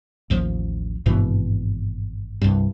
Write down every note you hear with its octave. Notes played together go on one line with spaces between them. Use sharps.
A1 D#2 F3
G#1 G2 B2 E3
C2 G2